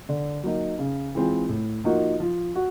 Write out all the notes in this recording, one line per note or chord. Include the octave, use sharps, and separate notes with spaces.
D3
F#3 A#3 D#4
C#3
E3 G#3 C4 F4
A2
F3 A#3 D#4 F#4
F3
F#4